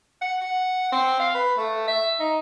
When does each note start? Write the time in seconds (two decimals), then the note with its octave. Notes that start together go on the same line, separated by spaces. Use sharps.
0.21 F#5
0.41 F#5
0.92 C4
1.19 F5
1.34 B4
1.57 A3
1.88 E5
2.19 D#4